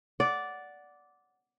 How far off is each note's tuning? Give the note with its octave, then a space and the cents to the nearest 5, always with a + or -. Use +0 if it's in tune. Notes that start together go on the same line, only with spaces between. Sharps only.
D5 -10 F#5 +0